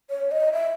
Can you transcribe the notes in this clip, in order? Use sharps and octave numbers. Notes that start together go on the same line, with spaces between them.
C#5
D#5
E5